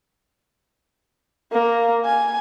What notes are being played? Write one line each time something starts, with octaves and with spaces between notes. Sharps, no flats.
A#3
G#5